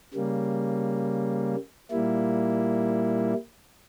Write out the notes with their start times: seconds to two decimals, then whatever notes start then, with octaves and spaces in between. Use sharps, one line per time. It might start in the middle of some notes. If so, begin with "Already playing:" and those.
0.14 C#3 G3 A#3
1.91 A#2 G3 A#3 E4